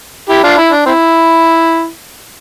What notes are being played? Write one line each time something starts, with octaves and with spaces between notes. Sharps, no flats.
E4 G4
D4 F4
E4
D4
C4 E4